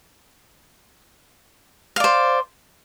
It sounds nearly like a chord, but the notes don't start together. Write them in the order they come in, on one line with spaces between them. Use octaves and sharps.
F5 D5 C5